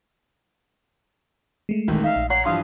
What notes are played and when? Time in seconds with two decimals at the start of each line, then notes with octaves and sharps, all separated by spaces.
1.69 G#3 A3
1.88 D#1 D#3 E3
2.04 D#4 E5 F5
2.16 A#1
2.30 C#5 F#5 A#5 C7
2.45 G2 E3 F3 F5 C6 D#6